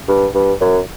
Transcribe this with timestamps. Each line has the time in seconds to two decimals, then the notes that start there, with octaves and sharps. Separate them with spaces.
0.08 G2
0.34 G2
0.61 F#2